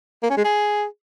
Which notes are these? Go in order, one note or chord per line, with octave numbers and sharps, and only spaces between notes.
A#3
C#4
G#3
G#4